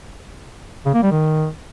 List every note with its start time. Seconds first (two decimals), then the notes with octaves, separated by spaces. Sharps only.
0.86 C#3
0.94 A#3
1.03 G3
1.11 D#3